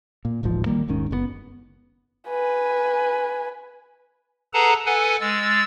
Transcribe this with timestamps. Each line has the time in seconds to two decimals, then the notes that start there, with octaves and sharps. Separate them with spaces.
0.25 A#2
0.43 D1 A1 G#2 F3
0.66 D#3 E3 G3 A#3
0.88 D#1 G#2 D#3 C#4
1.11 F#1 B2 B3
2.29 B4 G#5
4.53 G#4 A4 B4 F#5 A5 A#5
4.86 A4 B4 F#5 G#5
5.21 G#3 E6 A6